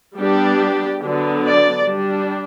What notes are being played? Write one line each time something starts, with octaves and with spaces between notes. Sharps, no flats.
G3 B3 D4 G4
D3 F#3 B3 D4
D5
G3 D4